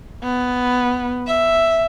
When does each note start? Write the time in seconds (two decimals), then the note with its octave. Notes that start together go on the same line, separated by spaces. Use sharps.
0.23 B3
1.27 E5